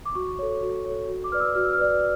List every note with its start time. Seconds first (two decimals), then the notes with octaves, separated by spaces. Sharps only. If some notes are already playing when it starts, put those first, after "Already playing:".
0.06 D6
0.15 F#4 C#6
0.39 A4 C#5
0.62 F#4
0.86 A4 C#5
1.08 F#4
1.24 D6
1.32 B4 D5 F6
1.40 E6
1.55 F#4 F6
1.64 E6
1.73 F6
1.78 B4 D5